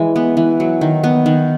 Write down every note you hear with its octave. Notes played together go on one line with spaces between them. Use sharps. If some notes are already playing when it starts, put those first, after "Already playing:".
Already playing: E3 G#3
B3
E3
F#3
D#3
B3
D#3